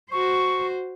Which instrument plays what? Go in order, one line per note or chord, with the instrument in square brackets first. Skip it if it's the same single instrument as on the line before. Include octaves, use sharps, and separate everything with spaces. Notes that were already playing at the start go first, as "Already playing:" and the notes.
[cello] F#4 C5 [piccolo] C#6